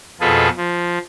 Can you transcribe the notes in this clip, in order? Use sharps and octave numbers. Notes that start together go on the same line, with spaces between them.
F2 B2 F4 G#4 A4 B4
F3